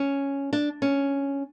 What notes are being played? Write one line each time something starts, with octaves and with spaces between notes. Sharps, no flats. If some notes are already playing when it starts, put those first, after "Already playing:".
Already playing: C#4
D4
C#4